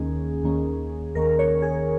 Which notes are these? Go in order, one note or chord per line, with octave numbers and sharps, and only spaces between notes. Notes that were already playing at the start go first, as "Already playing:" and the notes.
Already playing: D#2 D#3 A#3 C#4 G#4
D#2 D#3 A#3 C#4
D#2 D#3 A#3 C#4 A#4
C#5
G#4